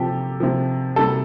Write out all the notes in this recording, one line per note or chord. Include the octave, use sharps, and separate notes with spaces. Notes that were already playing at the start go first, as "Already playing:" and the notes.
Already playing: C3 F3 G4 A4
C3 F3
C3 G3 A4